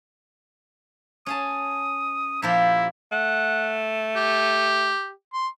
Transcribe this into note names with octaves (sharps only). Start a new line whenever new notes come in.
C#4 G#4 A5 D#6
A#2 F3 E4 G4
A3 F#5
G4
C6